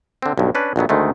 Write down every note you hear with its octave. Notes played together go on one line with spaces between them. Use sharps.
D3 C4
B1 G2
C#4 D4 B4
A#1 F2 F#3 B3
D2 D#3 G#3 A3